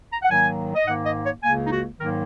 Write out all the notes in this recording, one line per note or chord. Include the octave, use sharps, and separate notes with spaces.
A#5
F#5
G#2 D#3 F#3 A#3 G#5
D#5
G#2 D#3 A#3 F#5
D#5
C#5
C#2 C#3 A#3 G#5
D#4
F#4
G#2 D#3 F#3 A#3 A#4